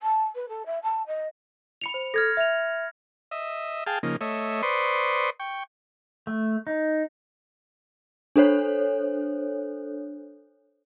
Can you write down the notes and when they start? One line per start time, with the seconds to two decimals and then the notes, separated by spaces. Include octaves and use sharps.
0.02 A5
0.35 B4
0.48 A4
0.66 E5
0.83 A5
1.07 D#5
1.81 B5 C#7 F7
1.94 C5
2.14 A4 F6 G#6 A#6
2.37 E5 F7
3.31 D#5 E5
3.87 G#4 F5 G5 A5
4.03 C#3 F3 A#3 D#4
4.21 A3 C#5 D#5 E5
4.63 B4 C5 D5 C6 C#6 D#6
5.40 G5 C#6
6.27 A3
6.67 D#4
8.36 D4 A4 C5 C#5